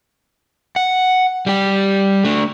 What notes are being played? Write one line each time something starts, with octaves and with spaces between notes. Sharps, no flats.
F#5
G3 G4
A3 D4